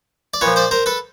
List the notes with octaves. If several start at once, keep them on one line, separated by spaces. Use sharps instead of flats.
D5
A#2 F3 B4 C#5
C5 D5
A#4 C5
A4 B4